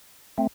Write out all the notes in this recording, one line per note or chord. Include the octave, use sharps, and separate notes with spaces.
A3 C4